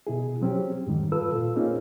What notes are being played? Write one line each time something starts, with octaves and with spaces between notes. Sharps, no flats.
B2 E4 G#4
F#3 C4 C#4 G4
F2 G#2 D#3 G3
F4 A4 B4 E6
A#2 F4
A#3 C4 C#4 D#4 F4 G#4